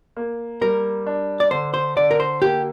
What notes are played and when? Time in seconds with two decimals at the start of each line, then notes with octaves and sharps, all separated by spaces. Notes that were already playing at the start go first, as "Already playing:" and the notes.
0.17 A#3
0.61 G3 A#4
1.06 D4
1.40 D5
1.51 D3 C5
1.74 C5
1.96 D3 D5
2.11 A#4
2.20 C5
2.42 A#3 G4